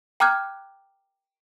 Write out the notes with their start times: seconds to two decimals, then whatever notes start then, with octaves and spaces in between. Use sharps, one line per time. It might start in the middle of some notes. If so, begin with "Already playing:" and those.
0.20 G5 A#5 D6 F6 F#6 G#6